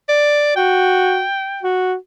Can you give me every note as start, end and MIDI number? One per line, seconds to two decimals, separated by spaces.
0.09 0.55 74
0.56 1.24 66
0.56 1.65 79
1.62 1.95 66